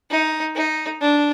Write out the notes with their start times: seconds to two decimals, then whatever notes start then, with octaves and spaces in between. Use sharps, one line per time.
0.11 D#4
0.56 D#4
1.01 D4